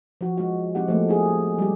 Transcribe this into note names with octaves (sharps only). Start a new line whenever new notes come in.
F3 F#4
G#3 F#4
F3 G#3 C4 E4 G4 F#5
F3 A3 A#3
E4 G4 G#4
G3 G4